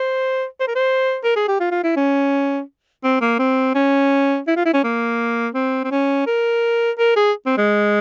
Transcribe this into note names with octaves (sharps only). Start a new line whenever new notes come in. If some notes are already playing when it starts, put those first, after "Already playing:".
Already playing: C5
C5
A#4
C5
A#4
G#4
G4
F4
F4
E4
C#4
C4
A#3
C4
C#4
E4
F4
E4
C#4
A#3
C4
C4
C#4
A#4
A#4
G#4
C4
G#3